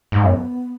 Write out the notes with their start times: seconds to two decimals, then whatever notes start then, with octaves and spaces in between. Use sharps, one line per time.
0.12 G#2
0.24 F#2 B3